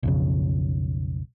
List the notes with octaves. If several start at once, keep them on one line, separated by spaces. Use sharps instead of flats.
B1 F2 C#3